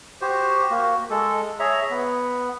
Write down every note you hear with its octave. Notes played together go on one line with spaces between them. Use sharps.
F#4 G4 C5
A#3 F#4
G#3 A4
G#4 C#5 E5 A#5
B3